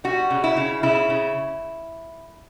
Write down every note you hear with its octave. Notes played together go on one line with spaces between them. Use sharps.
G3 F#4
C#3
E4
C#3
C#3 E4
C#3